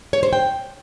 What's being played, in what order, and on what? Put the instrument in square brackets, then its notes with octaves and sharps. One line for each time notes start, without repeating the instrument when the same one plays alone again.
[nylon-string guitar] C#5
C5
G5